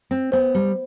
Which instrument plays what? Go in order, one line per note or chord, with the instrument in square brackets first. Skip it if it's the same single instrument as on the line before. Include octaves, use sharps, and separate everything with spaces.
[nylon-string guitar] C4
[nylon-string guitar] B3 [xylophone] C5
[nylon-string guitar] G3